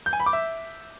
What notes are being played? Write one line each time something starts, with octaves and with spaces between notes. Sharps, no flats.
G6
G#5
B5
D6
E5